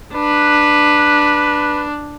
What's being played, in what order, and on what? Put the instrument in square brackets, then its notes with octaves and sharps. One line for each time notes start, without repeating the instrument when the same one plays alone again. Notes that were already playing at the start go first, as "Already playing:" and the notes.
[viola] D4 [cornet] B4